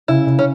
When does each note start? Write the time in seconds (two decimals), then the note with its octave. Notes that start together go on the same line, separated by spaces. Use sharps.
0.08 C#3 E4
0.27 C#3
0.39 C#4